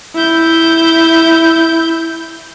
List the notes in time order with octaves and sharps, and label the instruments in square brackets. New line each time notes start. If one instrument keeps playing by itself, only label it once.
[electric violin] E4 G6